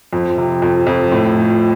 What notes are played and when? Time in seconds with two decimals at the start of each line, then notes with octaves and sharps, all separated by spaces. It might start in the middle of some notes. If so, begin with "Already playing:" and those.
0.13 F2
0.38 C3
0.62 F2
0.87 F2
1.12 A2
1.36 F3